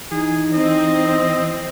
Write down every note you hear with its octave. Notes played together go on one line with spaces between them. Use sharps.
E3 D#4 G#4
C4 D#5